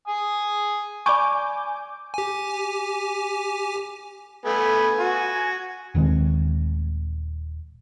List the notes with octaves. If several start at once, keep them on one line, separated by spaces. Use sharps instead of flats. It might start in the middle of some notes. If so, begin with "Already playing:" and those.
G#5 D#6
D5 G#5 B5 C#6 D6 G6
G4 G#5
A3 B3 G#5
F#4
D#1 D#3 G#3 C4